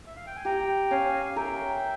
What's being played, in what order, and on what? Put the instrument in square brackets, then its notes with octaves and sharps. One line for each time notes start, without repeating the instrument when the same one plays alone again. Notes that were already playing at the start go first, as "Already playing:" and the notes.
[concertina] E5
F5
G5
G#5
[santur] G4 [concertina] G5 A#5
[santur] C#4 [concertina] F5 G#5
[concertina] F5
[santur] A#4 [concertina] E5 G5